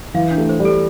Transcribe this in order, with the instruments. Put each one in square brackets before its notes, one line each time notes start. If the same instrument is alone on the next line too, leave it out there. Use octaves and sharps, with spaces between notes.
[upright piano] E3 [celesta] F5
[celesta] D4
[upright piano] A3
[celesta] C5
[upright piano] G3
[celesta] A4